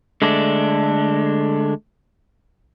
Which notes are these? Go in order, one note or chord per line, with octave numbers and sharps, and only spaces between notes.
D3 G#3 A3 D4